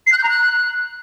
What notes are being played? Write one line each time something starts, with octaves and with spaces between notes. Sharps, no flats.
C7
F#6
G6
A#5
F#6